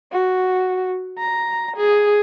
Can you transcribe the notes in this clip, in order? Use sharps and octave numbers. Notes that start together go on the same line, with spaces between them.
F#4
A#5
G#4